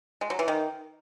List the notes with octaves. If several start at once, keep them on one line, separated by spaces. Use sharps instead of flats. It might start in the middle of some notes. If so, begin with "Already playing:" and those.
G#3
F#3
E3
D#3